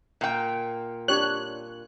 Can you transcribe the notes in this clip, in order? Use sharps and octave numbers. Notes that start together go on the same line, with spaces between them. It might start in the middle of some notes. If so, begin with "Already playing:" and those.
A#2 G5
D4 G4 C#5 F#6